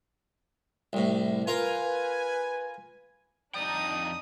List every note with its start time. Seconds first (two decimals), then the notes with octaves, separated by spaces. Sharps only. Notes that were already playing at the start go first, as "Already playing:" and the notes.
0.93 C2 A2
1.47 F4 A#4 B4 G#5
3.54 F2 D4 D#4 D5 G5 D#6